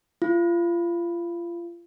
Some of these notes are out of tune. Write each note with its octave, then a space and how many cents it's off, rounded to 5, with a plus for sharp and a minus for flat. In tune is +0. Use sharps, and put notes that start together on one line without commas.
F4 -30